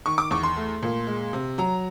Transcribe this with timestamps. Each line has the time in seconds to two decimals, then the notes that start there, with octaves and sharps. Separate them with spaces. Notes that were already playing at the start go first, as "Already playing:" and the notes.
0.06 D#3 C#6
0.18 D6
0.31 E2 C#6
0.43 C6
0.56 A3
0.83 A#2
1.07 G#3
1.33 C3
1.58 F#3 A#5